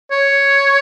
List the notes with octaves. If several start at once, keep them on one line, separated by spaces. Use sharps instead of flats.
C#5